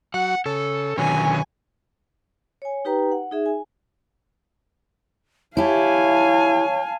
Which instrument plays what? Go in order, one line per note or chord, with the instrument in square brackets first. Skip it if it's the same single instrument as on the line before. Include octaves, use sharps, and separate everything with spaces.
[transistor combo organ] F#3 F#4 [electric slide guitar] F#5
[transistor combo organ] C#3 [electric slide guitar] A4
[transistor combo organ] B2 C#4 [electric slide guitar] D3 D#3 F#3 [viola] G#5
[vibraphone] C#5 G#5
D#4 G4 B4 G5 A#5
F#5
D#4 G#4 E5
G#5
[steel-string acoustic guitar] E4 G4 [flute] C#5 [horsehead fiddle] F5 G#5 [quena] A5